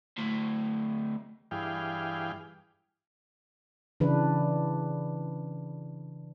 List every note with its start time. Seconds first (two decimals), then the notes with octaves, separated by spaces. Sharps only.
0.18 D2 A2
1.51 G2 E3 G#4 F5 G5
4.00 C#3 E3 D4 B4